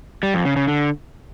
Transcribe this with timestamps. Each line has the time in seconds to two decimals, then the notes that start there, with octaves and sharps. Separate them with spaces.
0.23 G3
0.34 F2
0.45 C#3
0.56 C#3
0.68 D3